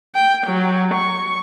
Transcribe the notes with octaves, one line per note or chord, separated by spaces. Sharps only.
G5
F#3
C#6